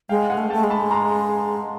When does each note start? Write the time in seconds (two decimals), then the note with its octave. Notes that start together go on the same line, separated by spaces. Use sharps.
0.09 G#3 F5 G5
0.30 F#5 G#5
0.37 A3
0.50 A3 G5 A5
0.64 G#3
0.70 A5 B5
0.91 A#5 C6